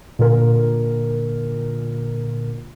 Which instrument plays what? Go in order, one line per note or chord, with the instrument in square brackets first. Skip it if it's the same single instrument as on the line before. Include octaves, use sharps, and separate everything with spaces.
[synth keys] A#2 D3 A#4